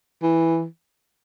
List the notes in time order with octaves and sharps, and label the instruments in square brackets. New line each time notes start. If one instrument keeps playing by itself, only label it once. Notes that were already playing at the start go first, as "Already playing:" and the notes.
[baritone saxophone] E3